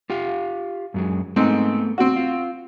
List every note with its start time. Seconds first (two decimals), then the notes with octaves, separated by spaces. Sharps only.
0.10 F4 G4 F5
0.94 F#2 F#3 G#3
1.36 G#2 A3 B3 C4
1.98 C4 F#4
2.16 F4